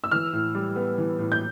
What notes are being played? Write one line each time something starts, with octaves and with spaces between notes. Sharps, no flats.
E6
E3 F6
A2
G3
B3
E3
A2
G6